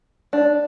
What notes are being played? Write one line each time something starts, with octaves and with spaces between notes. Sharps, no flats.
D4